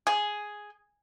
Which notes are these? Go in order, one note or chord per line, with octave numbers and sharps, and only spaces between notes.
G#4